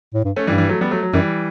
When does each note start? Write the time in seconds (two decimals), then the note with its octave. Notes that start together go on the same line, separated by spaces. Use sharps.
0.14 A2
0.25 G2
0.36 A3 C#4
0.47 G2 E3 G3
0.58 E3 G3
0.69 F#3 A3
0.81 G3 B3
0.91 F#3 A3
1.03 F#3
1.13 F#2 E3 G3